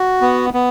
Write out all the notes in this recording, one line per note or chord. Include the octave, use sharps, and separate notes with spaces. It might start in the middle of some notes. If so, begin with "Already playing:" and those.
Already playing: F#4
B3
B3